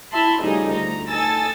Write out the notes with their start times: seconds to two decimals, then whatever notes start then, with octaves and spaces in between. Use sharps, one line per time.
0.12 E4 E5 A5 B5 C6
0.41 C#3 F3 G3 A3 D#4 G#4
0.73 D2 A#5
1.08 D#4 A4 G#5 E6 A6